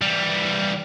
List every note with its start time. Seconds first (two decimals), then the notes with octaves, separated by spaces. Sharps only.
0.02 E3 G3